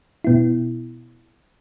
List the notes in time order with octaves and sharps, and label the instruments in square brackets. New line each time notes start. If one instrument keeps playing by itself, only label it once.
[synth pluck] B2 B3 E4